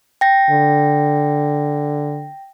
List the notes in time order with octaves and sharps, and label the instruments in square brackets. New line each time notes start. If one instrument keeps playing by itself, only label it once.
[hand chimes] G5 A#6
[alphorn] D3